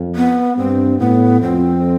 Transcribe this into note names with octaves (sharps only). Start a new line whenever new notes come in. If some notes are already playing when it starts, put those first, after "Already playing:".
Already playing: F2
B3
G2 C4
A2 B3
F2 C4